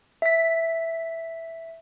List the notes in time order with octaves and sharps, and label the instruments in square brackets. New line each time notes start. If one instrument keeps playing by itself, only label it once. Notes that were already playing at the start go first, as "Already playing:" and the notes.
[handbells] E5 B6